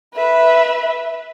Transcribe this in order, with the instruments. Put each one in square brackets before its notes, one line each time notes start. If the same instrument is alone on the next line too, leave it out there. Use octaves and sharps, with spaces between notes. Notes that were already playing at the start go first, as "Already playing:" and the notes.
[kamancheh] B4 E5